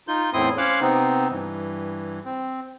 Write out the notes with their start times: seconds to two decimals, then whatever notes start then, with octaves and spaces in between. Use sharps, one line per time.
0.08 D#4 F4 G6
0.33 E2 A2 C4 E4 C6 D#6
0.58 C#4 C5 C#5 F5 D6 F#6
0.81 C3 B3 C4 D#4
1.30 G2 E3
2.25 C4